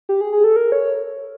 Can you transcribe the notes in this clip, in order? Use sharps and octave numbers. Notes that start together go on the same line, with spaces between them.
G4
G#4
G#4
A4
A#4
C#5